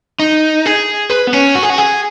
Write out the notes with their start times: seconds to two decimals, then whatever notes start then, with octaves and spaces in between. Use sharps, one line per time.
0.19 D#4
0.66 G#4
1.10 B4
1.27 B3
1.33 C#4
1.55 F#4
1.63 G#4
1.70 F#4
1.78 G#4